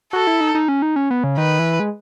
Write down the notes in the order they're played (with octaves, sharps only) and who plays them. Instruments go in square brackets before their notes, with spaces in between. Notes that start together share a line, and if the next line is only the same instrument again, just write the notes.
[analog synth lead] F#4 [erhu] A4
[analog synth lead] E4
D#4
D#4
C#4
D#4
C#4
B3
C#3
[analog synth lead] D#3 [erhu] B4
[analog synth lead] E3
G#3